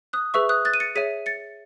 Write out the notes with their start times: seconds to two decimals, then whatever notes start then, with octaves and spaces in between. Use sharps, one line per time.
0.13 D#6 F#6
0.34 G#4 B4 E5 C#6 E6
0.49 D#6 F#6
0.65 F#6 A6
0.74 D#7
0.80 A6 C#7
0.95 G#4 C#5 E5 B6 D#7
1.26 A6 C#7